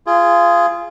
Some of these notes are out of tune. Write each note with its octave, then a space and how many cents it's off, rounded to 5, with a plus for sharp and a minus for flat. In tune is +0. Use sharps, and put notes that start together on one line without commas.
F4 -20 G#4 +0